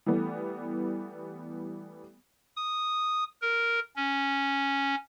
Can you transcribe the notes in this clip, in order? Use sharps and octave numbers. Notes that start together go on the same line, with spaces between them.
E3 G3 A3 B3
D#6
A#4
C#4